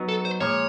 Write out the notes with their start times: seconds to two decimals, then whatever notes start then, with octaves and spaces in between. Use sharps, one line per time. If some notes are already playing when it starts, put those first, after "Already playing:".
Already playing: F#3 B3 D#4
0.09 A4
0.25 C5
0.40 A#2 F3 G#3 C#5